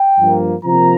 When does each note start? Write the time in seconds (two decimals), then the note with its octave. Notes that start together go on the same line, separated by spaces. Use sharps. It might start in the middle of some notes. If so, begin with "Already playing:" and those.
Already playing: G5
0.18 G2 F3 A#3
0.64 C3 F3 A#3 A#5